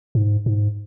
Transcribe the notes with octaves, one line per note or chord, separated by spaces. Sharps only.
G#2
G#2